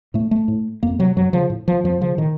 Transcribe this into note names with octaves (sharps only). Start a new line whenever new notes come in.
A2 A3
A3
A2
F2 A#3
C3 F#3
F#2 F#3
C#3 F3
A2
F3
F2 F3
C#3 F3
A2 D#3